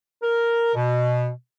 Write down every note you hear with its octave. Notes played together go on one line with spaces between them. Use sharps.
A#4
B2